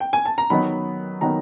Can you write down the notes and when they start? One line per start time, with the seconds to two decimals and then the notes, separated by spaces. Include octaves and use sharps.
0.00 G5
0.13 G#5
0.25 A5
0.38 A#5
0.50 D#3 F#3 B3 D#4 B5
1.21 D#3 F#3 B3 D#4 A#5